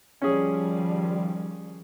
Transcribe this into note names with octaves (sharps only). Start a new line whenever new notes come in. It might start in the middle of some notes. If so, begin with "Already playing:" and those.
D#3 F3 G3 C#4 G#4